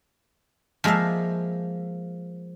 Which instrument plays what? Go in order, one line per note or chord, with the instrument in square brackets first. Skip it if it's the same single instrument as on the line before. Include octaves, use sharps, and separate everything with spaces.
[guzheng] F3 G#3 A#3 E5 F5